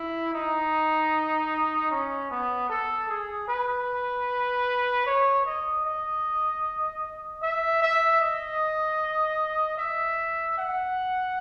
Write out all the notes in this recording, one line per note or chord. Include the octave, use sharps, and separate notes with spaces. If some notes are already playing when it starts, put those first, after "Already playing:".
Already playing: E4
D#4
C#4
B3
A4
G#4
B4
C#5
D#5
D#5
E5
E5
D#5
E5
F#5